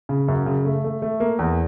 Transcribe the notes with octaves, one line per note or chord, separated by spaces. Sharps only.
C#3
F#2
C#3
A3
A3
A3
A#3
E2